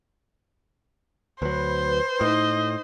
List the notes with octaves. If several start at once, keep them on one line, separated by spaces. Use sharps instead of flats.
D2 F#3 B4 C5
A2 D#4 D#5